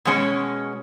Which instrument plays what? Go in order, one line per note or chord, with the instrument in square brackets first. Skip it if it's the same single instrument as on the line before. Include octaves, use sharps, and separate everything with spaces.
[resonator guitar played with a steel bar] B2 G#3 C#4